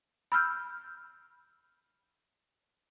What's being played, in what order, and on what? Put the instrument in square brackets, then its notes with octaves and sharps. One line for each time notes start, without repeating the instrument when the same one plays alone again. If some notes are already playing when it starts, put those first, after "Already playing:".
[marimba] B5 E6 F6 G6